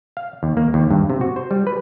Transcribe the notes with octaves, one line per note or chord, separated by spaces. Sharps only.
F5
D#2
A#3
D#2
G2
C3
F#4
C5
G3
B4